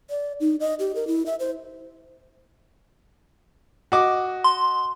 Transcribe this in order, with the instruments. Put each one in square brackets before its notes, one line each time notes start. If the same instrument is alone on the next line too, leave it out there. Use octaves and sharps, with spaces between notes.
[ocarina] D5
D#4
D#5
G4
A#4
E4
E5
C5
[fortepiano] F#4 D#5 D6
[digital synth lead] C6